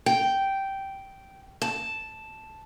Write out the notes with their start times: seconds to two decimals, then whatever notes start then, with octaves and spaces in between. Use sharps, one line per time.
0.06 G5
1.62 A5